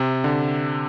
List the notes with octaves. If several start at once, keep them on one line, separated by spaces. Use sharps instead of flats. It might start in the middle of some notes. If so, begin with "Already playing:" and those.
Already playing: C3
D3